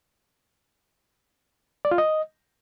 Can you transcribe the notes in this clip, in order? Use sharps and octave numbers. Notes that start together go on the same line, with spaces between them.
D5
F4
D#5